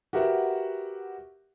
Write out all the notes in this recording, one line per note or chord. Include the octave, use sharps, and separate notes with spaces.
F#4 G4 A#4 B4 E5 F#5